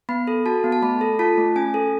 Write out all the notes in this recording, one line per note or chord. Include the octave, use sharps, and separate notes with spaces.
B3 B5
A4
F#4 A5
B3
A5
A3 B5
A4
F4 A5
A3
C#4 G#5
A4